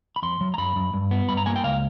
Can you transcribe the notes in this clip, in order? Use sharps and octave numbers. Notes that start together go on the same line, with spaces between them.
B5
F2 C6
F#3
A#5
F#2 B5
F#2
G2
B3
G2 B5
A#5
A#3 G#5
G5
C#2 F5